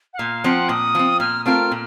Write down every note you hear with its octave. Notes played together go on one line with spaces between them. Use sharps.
F#5
A#2 F5
F3 C4 F#5
A#2 D#6
F3 C4
A#2 F6
A3 C4 F4 A#4 F6
A#2